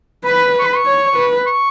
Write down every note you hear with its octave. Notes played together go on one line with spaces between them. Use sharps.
B4 B5
C#6
B5
C#6
C#5
B4
C#6